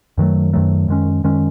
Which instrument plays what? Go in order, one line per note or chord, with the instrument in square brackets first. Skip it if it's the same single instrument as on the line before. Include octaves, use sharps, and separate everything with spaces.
[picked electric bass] F#2 D#3 F#3 A3
F#2 D#3 F#3 A3
F#2 D#3 G#3 C#4
F#2 D#3 G#3 C#4